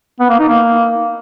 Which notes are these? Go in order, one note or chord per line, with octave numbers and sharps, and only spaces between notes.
B3
A#3
D#4
A#3